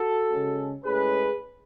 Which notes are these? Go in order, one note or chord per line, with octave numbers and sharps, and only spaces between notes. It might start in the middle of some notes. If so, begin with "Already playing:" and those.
Already playing: F#4 A4
C#3 G#3 C#4
A2 G#3 C#4 G#4 B4